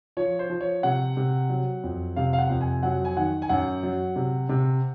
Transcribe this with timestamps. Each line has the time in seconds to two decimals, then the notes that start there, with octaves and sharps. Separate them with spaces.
0.17 F3 C#5
0.39 C5
0.50 F3
0.61 C#5
0.83 C3 F#5
1.17 C3
1.49 F#3
1.84 F2
2.16 C3 F5
2.33 F5
2.39 F#5
2.50 F2
2.61 G#5
2.83 F#3 F#5
3.05 G#5
3.17 D#3 F#5
3.42 G#5
3.49 F#2 F#5
3.83 F#3
4.16 C3
4.49 C3